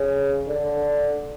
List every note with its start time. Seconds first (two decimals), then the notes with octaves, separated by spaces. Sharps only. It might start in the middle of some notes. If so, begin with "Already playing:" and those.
Already playing: C#3
0.48 D3